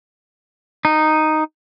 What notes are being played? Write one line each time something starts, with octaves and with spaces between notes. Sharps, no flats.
D#4